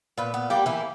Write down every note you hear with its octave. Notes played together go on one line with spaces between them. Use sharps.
A#2 B3
B3
G3 A#3 G4
E3 E4